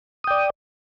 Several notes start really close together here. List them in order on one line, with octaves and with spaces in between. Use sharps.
D#6 G5 D5